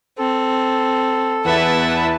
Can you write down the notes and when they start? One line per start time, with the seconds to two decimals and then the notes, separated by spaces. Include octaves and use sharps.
0.18 C4 A4
1.44 E2 E4 B4 E5 F#5 A5